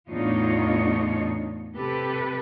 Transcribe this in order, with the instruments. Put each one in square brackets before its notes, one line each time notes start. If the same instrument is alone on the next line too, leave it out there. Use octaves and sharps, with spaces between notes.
[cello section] E2 A2 D4 D#4 F4 C#5
C3 G4 A4 B4